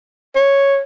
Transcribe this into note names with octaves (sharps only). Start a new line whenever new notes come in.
C#5